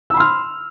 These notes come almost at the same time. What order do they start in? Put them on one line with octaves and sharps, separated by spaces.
E6 B5 C6 F6